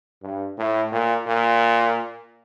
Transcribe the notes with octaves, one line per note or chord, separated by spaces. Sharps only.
G2
A2
A#2
A#2